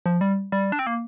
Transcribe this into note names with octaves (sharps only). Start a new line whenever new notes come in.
F3
G3
G3
D4
C4
A#3